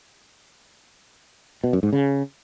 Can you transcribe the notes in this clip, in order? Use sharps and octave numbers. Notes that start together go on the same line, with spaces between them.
B2
F#2
G#2
C#3